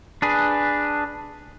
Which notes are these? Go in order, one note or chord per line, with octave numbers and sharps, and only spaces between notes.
D4 G#4 B4